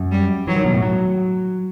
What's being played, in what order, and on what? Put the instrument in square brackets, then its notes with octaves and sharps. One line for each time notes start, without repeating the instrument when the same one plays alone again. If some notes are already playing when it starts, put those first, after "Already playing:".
Already playing: [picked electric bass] F#2
[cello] G3
[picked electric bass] E3 [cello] F#3
[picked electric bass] D#3
B2
A2
F#3